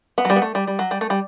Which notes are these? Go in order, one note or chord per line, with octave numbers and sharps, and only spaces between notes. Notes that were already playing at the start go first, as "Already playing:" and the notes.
B3
F#3
G3
B3
A3
G3
G3
F#3
G3
A3
G3